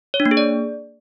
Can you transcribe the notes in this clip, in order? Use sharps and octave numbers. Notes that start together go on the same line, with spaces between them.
C#5
D4
A#3
G#4
D5